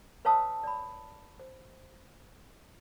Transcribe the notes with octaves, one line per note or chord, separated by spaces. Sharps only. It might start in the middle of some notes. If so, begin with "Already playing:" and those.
B4 C#5 F5 A5 D#6 E6
D5 B5
C5